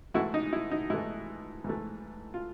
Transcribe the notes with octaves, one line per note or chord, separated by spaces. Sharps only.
G#2 E3 A3 E4 F#4
D#4
E4
D#4
G#2 E3 A3 E4
G#2 E3 A3
F4